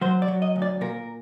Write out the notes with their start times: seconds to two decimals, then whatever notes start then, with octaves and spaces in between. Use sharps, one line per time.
0.01 F#3 C5
0.22 D5
0.28 F#3
0.42 D#5
0.56 D2
0.62 D5
0.81 A#2 A#4